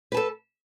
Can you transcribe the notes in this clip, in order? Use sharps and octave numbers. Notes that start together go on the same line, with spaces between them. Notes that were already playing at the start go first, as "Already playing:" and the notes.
A4 B4 A5